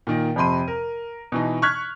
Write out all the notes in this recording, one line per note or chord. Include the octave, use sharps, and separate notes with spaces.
A#2 D#3
F2 C3 B5 C6 D#7
A#4
B2 E3 D#4
C#6 F6 F#6 G#6 B6